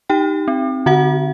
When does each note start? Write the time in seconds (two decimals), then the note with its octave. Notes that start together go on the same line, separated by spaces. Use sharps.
0.09 D#4 G4 G5
0.48 C4
0.86 D3 F#4 F#5